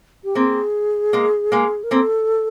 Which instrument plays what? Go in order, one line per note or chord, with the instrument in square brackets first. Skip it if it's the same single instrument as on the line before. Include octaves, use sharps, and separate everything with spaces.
[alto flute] G4
[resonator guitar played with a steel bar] A#3 C4 [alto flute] G#4
[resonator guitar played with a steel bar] G#3 A#3
G#3 A#3
[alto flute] A#4
[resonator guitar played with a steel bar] A#3 C4 [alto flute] A4